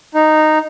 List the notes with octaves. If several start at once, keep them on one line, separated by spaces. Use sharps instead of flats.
D#4